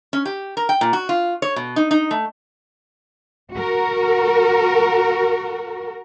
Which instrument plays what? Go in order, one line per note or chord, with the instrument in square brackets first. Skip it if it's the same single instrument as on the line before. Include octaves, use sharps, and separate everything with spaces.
[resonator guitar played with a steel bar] C#4
G4
A#4
G5
A#2
F#4
F4
C#5
B2
D#4
D#4
A3
[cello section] F#4 A#4